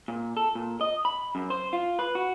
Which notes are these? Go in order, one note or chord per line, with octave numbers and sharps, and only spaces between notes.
A#2
A4
A#2
D#5
B5
F#2
C5
F4
B4
F#4